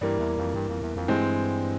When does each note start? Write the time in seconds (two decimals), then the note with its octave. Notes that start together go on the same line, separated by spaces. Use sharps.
0.01 G2 E3 G3 A#3
0.19 E2
0.38 F2
0.54 G2
0.69 F2
0.82 E2
0.96 F2
1.08 G2 E3 G#3 C4